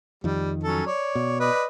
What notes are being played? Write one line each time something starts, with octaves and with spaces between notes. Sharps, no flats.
F2 D#3 G3
F#3 C#4 A4
C#5 D5
B2
B4 D5 D#5